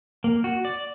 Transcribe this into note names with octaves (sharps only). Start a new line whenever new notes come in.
A#3
F#4
D5